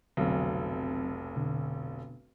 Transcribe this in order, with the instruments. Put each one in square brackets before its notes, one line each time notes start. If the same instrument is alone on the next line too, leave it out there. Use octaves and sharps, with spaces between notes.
[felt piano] F1 B1 [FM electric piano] D3 F#3 C4
[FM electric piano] B2 D3